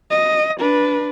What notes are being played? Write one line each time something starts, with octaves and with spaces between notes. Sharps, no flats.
D#5
D4 B4